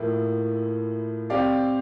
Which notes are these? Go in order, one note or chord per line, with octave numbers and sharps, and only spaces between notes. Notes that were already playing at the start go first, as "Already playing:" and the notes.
Already playing: A2 F3 A#3 E4
C4 G4 D5 F5